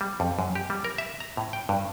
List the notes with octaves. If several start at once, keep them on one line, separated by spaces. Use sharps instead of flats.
G3
F2
F#2
G4
G3
A#4
E5
A#5
A2
G5
G2